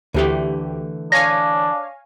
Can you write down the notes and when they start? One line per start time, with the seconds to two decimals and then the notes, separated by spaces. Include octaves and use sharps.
0.14 D2 D3 E3 A3 G4
1.12 D4 C#5 F5 G#5 A#6